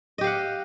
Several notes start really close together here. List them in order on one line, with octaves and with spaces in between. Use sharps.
D#5 G4 F5 F#5